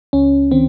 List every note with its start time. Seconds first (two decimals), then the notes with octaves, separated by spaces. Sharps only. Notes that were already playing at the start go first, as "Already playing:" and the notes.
0.13 C#2 C#4
0.51 D#3 C4